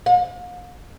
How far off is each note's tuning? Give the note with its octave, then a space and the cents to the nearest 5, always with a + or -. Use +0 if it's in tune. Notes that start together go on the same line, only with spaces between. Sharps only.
F5 +40